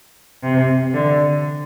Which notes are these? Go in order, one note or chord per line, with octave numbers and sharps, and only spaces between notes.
C3
D3